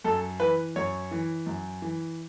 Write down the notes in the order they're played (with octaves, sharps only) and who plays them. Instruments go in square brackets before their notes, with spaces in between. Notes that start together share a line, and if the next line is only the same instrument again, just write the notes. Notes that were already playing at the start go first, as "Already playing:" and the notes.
[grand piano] F#2 A4
E3 B4
F#2 C#5
E3
F#2
E3